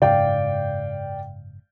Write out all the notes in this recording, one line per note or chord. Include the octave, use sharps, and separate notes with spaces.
F#1 G#2 C#3 D5 F5 G5